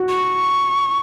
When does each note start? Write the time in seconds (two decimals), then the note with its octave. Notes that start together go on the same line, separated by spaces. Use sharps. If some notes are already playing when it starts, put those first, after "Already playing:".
Already playing: F#4
0.09 C#6